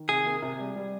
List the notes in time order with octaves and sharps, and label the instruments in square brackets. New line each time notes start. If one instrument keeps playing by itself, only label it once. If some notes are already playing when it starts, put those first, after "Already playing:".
Already playing: [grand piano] D#3
[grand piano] C3 [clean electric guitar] G#4
[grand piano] A#3
C3
G3
G3